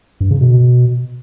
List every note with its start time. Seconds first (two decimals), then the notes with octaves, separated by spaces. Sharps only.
0.21 G2
0.31 C#3
0.41 B2